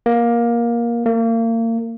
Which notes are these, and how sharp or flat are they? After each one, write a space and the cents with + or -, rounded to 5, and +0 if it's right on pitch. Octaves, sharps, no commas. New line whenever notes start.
A#3 +15
A#3 -35